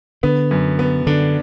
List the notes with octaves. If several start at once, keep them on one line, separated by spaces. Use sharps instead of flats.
D3 B3
F#2
B3
D3 D4